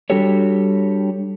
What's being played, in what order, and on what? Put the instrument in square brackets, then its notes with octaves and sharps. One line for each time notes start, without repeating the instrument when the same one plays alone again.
[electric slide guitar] G3 D4 F#4 G4 A4 C#5